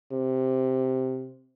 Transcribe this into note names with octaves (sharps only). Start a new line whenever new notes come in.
C3